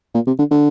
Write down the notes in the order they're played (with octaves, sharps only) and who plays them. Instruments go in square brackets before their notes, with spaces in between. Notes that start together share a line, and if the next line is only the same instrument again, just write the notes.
[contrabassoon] A#2
C3
D3
D3